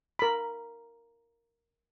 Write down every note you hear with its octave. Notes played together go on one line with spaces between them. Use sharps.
A#4 B5